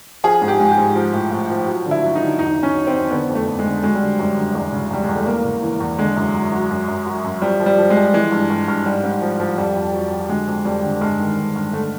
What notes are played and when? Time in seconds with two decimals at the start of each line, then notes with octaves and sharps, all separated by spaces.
0.24 F3 G#4
0.42 G#2
0.48 G4
0.60 G#2
0.72 G4
0.78 G#2
0.96 F3
1.14 A2
1.31 A2
1.50 F3
1.67 F#3
1.86 D3
1.91 E4
2.03 F#3
2.15 D#4
2.21 D3
2.39 E2 D#4
2.57 E2
2.63 C#4
2.75 F#3
2.87 C4
2.93 E2
3.11 D3 B3
3.29 F2
3.35 A3
3.47 F2
3.59 G#3
3.65 D3
3.83 F#3 G#3
3.95 G3
4.01 D3
4.19 F#2 G3
4.37 D3
4.55 E2 G#3
4.73 C#3
4.90 E2 G3
5.04 E2 G#3
5.15 A3
5.26 E2 A#3
5.45 C#3
5.62 E3
5.80 E2
5.99 D3 G#3
6.17 F#2
6.34 F#3
6.52 F#3
6.71 F#2
6.88 F#2
7.06 F#3
7.24 F#2
7.42 F3 G3
7.60 F3
7.66 G3
7.78 F3
7.90 G#3
7.96 F3
8.14 E3 G#3
8.32 G2
8.50 G2
8.68 G2
8.86 G#2 G3
9.04 G#2
9.22 F3
9.40 F3
9.57 F2 G3
9.75 F2
9.94 F#3
10.11 F#3
10.29 D3 G#3
10.47 F2
10.65 F2 G3
10.83 D3
11.01 G2 G#3
11.19 D#3
11.37 G2
11.56 G2
11.73 D3 A3